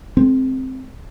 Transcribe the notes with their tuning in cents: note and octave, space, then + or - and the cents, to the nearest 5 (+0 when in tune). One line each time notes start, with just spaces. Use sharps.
G#3 +45 C4 +0